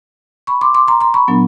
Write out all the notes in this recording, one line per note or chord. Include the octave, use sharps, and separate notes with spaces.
B5 C#6
C6 D6
C6 D6
A#5 C6
A#5 C6
B5 C#6
A#2 F#3 B3 D4